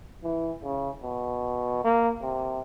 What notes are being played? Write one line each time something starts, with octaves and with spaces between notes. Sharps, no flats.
E3
C#3
B2
A#3
C3